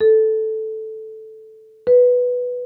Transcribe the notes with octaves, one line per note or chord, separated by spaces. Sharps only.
A4
B4